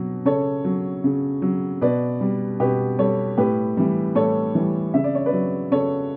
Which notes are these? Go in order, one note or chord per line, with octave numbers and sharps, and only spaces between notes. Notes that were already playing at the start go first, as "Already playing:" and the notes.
Already playing: B2 F#3
C#3 A4 C#5
F#3
C#3
F#3
B2 B4 D5
G3
B2 G4 B4
G3 A4 C#5
A2 G4 B4
E3 G3
A2 A4 C#5
E3 G3
C#3 E5
D5
C#5
B4 D5
F#3
C#3 A4 C#5